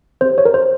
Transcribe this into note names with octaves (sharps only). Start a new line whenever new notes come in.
C4 G4 C5
C#5
A#4
C5